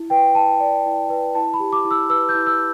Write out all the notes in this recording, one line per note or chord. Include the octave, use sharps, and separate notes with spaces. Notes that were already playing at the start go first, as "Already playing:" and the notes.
Already playing: E4
B4 G5
E4 A5
D5
E4
B4
E4 A5
B5
G4
D6
E4
E6
B4 E6
G6
E4
E6